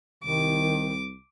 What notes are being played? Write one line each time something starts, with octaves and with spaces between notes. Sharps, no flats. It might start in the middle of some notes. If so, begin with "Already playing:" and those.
C2 D#3 D6